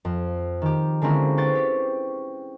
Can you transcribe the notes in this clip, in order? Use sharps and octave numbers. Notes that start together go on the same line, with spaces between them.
F2
D#3 G4
D3 G#3 A#3 C4 C#4 E4
B4 C5 G5 C#6 A6
G4